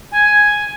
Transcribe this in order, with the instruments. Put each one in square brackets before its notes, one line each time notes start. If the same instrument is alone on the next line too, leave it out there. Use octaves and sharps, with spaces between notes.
[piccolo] G#5